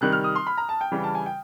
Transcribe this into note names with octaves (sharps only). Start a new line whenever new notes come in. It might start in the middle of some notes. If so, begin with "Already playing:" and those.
C3 D#3 G3 F#6
F6
D#6
C6
B5
A#5
A5
G5
C#3 E3 G3
A5
G#5
G5